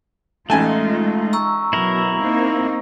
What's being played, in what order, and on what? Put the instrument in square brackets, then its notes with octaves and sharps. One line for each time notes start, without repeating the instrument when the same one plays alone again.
[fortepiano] A1 G#5 A5 [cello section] G#3 D#4 F4 [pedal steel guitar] A3
[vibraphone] A#5 C#6 E6
[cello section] B2 F#3 [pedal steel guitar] E4 A#4
[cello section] A#3 C4 D#4